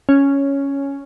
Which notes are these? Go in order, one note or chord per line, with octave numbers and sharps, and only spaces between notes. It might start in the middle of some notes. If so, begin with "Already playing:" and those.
C#4